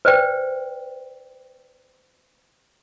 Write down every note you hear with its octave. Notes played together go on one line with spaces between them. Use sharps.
B4 C5 D5 G5